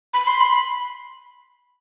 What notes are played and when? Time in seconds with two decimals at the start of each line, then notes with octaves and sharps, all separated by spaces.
0.14 B5
0.27 C6
0.40 B5